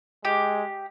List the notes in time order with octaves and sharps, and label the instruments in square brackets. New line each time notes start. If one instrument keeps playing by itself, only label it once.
[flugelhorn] G#3 [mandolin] G4